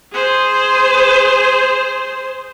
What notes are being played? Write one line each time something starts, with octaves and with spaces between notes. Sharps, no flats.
G#4 C5